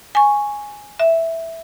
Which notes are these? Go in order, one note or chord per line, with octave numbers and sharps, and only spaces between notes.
G#5 C#6
E5